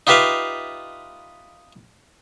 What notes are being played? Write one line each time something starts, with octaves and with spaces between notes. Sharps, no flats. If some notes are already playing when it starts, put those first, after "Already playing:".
D#4 F4 G4 B4 E5 F5